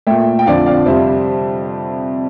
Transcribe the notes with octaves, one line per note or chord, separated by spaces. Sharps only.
A#2 A3 E5 G5
G5
F2 D3 F3 D5 F5
D5 F5
F2 C3 G3 C5 E5